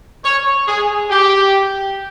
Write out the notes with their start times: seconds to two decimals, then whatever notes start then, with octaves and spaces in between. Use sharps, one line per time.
0.24 C#5
0.68 G#4
1.10 G4